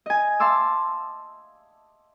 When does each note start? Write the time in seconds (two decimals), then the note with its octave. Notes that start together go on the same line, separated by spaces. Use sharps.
0.06 D#5 G#5
0.40 F5 A5 C6 D6 E6